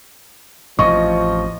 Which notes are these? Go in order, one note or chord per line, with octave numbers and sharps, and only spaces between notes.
A1 F2 F3 D#5 C#6